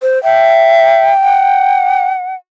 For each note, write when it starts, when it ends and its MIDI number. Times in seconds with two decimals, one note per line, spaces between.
0.02 0.22 72
0.24 1.11 76
0.24 2.07 79
1.23 2.35 78